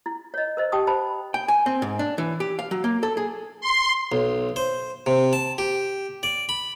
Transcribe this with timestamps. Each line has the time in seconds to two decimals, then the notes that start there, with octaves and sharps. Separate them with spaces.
0.06 E4
0.34 C#5 D#5
0.57 A#4 C5 D#5
0.72 G4 G5 A5 C#6 D#6
0.87 C5 A5 B5
1.34 G5
1.48 G#5
1.66 C4
1.82 G#2
1.99 D4
2.18 E3
2.40 G4
2.59 F5
2.71 F#3
2.84 A#3
3.03 A4
3.17 G#4
3.61 C6
4.12 B1
4.56 C5
5.06 C3
5.33 A5
5.58 G4
6.23 D5
6.49 B5